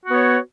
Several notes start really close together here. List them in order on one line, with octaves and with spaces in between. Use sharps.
F#4 B3 C#5